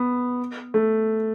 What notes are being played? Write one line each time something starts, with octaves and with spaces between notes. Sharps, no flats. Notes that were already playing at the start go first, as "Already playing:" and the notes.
Already playing: B3
A3